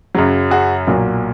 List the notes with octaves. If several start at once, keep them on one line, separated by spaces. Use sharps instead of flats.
F#2 C#3 F#3
F#4 G#4
B1 A#2 F#3 A#3